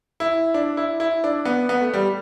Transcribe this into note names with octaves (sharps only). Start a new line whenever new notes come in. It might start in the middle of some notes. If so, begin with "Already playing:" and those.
E4
D4
E4
E4
D4
B3
B3
A3
G3